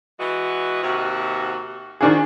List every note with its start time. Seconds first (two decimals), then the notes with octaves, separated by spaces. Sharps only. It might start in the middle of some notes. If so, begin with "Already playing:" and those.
0.19 E3 G#3 F#4
0.83 D#2 C3 F#4
2.01 D#3 F3 D4 F#4 G#4